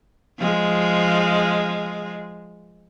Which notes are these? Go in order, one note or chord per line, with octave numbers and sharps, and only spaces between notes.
F3 G#3